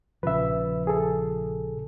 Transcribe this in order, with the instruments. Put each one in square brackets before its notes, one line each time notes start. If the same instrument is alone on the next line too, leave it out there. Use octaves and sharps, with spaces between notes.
[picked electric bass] A#1 C#3 F3 [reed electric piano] B4 E5
[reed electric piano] G#4 A4